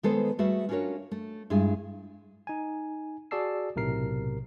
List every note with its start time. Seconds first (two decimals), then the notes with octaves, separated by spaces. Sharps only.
0.03 D#3 G#3 B3 A4 B4 C5
0.38 G3 A3 F#4 G#4 B4 E5
0.69 C#4 D4 F4 F#4 A#4 C#5
1.11 A3
1.50 G2 G#3 E4 F4 G#4
2.47 D#4 G#5
3.31 F#4 G#4 D5 A5 E6 C7
3.76 B1 A2 C3 A#4 C7